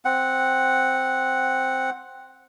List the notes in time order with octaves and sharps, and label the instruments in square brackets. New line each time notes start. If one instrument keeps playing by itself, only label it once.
[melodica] C4 F#5